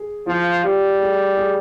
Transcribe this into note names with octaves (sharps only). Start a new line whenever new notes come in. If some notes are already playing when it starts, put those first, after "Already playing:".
Already playing: G#4
F3 F4
G3 G4
G#4
G#4